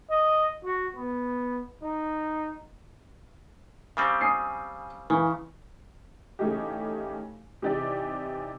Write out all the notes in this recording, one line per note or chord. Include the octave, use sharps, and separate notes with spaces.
D#5
F#4
B3
D#4
C#3 G3 C4
G#5 D#6 C7
C#3 E3
C#3 E3 A3 D#4 G4
C3 E3 D#4 G4 D5